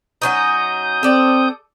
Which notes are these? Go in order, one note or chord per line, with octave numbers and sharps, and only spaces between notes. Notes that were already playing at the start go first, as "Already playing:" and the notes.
F#3 C#4 D#4 D#6 G6
C4 A4 D5